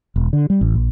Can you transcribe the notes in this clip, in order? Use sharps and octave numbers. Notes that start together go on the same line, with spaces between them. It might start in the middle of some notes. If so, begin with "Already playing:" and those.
E1
D3
G3
A1
A#1